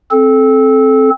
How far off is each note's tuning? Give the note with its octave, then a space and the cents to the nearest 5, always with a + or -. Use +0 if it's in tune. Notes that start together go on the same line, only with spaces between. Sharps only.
C4 +10 A4 -20